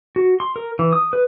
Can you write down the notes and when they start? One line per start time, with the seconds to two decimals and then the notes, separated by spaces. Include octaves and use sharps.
0.16 F#4
0.40 C6
0.56 A#4
0.79 E3
0.93 D#6
1.13 B4